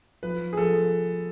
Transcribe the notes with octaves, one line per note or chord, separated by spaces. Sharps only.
F3 B4
G#4
F3 A4